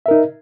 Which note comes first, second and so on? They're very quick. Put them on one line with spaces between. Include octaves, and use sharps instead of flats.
E5 A#4 D#4